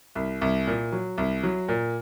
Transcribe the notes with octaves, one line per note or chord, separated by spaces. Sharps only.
C2
C2
A#2
F#3
C2
F#3
A#2